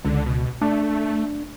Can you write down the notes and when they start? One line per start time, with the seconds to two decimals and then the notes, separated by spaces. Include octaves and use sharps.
0.05 C#2 D3
0.26 B2
0.62 A3 D4